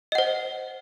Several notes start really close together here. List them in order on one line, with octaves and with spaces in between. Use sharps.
D#5 F#5 C5